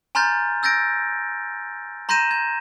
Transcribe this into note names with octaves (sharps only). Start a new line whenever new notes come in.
G#5 A#5 C6 F6 G6 A6
E6 G6 A6 A#6 D7
A#5 C6 G6 A#6 D#7 E7
G#6